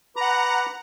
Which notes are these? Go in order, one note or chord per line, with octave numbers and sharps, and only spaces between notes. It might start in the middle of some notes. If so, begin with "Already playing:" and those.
B4 F#5 A#5 B5 D6